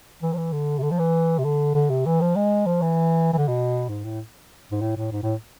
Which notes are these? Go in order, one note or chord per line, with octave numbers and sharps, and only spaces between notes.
E3
F3
E3
D3
C3
D3
F3
E3
C3
D3
D3
C3
E3
F3
G#3
F3
E3
E3
D3
B2
G#2
A2
G#2
A2
A2
G#2
A2